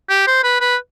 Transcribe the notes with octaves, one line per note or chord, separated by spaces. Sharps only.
G4
C5
B4
B4